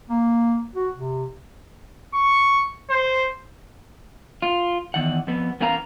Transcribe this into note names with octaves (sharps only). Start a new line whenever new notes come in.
A#3
F#4
C3
C#6
C5
F4
E2 D#3 F#5
F2 B3
E2 B3 C#4 A#4 F5 A#5